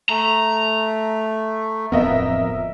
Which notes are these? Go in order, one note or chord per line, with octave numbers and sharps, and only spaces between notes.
A3 A#5
D1 F2 B3 A#4 D#5 E5